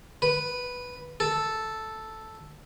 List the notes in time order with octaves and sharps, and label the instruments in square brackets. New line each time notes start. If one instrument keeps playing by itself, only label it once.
[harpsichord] B4
A4